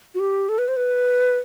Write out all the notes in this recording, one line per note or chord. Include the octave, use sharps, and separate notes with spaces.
F#4
G4
A4
B4
C5
B4